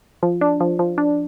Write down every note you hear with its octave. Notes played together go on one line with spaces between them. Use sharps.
F3
D4
F3
F3
D4